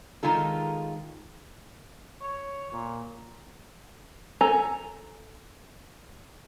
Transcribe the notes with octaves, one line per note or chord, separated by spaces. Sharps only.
D#3 G#3 F4 A4
C#5
A#2
A4 G#5 A#5